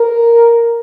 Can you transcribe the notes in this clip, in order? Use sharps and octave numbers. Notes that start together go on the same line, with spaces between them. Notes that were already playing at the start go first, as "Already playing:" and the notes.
Already playing: A#4